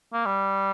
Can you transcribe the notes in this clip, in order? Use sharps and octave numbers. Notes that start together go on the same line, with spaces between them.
A#3
G3